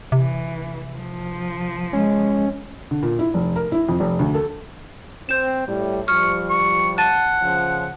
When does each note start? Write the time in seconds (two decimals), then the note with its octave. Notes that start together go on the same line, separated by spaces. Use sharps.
0.12 C3 E3
0.97 F3
1.93 G#3 C#4
2.91 D3
3.03 A#2
3.19 E4
3.34 F1
3.56 A#4
3.72 E4
3.89 F2
4.00 F1
4.19 D2
4.35 A4
5.29 C4 G6 E7
5.66 A2 G3
6.08 F3 G3 C#6 F6
6.50 C#6
6.98 F#5 A5 A6 D#7
7.42 C#3 F3